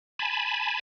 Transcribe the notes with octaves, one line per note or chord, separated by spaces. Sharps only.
G#5 A5 B5